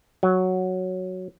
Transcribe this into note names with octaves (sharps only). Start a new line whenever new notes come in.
F#3